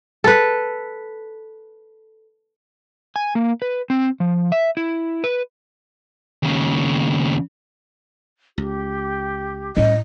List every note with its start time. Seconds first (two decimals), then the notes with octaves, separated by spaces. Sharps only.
0.24 A4 B4
3.16 G#5
3.35 A#3
3.62 B4
3.90 C4
4.20 F3
4.52 E5
4.77 E4
5.24 B4
6.43 D#2 C#3
8.58 C#2 G4
9.77 A2 G3 C#4 E4 D#5